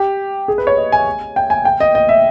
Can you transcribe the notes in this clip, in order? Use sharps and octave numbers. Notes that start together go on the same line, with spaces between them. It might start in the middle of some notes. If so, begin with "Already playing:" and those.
Already playing: G4
G#4
B4
C#5
D#5
G#5
G5
G#5
G5
D#5
D#5
E5